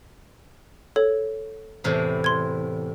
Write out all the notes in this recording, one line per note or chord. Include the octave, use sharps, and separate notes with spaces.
A4 C#5
E2 A2 C3
C6 G#6